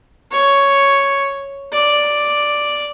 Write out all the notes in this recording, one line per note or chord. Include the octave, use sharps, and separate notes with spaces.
C#5
D5